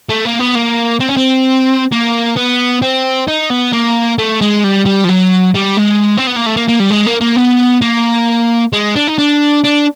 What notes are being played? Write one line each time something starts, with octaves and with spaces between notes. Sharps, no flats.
A3
A#3
B3
A#3
C4
C#4
C4
A#3
B3
C4
D#4
B3
A#3
A3
G#3
G3
G3
F3
F#3
G3
G#3
C4
B3
A#3
A3
A#3
A#3
G3
G#3
A#3
A#3
B3
A#3
G#3
D4
D#4
D4
D4